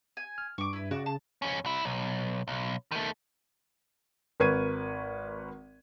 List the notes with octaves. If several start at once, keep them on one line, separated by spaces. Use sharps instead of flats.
G#5
F6
G2 C#6 D6
E4 B4
C#3 F#4 D5
A5
F2 C#4
C2 E4
B1
B1
D#3 A3
G#1 A#4 B4 C#6 G#6 D#7